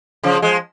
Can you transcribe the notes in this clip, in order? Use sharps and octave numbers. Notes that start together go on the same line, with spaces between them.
C#3 F3
F3 G#3